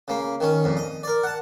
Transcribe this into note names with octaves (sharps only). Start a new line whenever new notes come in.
C#3 A#3
D#3 C#4
F2 A#2
D#5
A#4 D5
F#5 A5